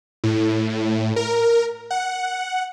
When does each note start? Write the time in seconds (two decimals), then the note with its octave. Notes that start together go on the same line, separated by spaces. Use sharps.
0.24 A2
1.16 A#4
1.91 F#5